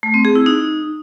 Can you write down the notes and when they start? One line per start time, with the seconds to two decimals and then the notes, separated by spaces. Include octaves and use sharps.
0.03 A3
0.14 C4
0.25 G#4
0.35 E4
0.46 D#4